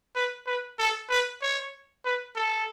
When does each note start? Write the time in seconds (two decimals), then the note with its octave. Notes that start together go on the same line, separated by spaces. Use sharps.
0.16 B4
0.47 B4
0.79 A4
1.10 B4
1.42 C#5
2.05 B4
2.36 A4